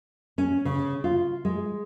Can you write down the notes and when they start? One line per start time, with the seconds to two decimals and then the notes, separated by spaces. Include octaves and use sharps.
0.38 C#4
0.65 C#3
1.04 F4
1.45 G#3